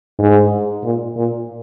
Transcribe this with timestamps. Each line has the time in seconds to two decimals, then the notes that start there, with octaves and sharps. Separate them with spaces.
0.19 G#2
0.84 A#2
1.16 A#2